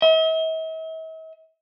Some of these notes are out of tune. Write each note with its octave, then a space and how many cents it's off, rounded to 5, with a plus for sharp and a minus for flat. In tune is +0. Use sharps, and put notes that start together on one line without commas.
E5 -45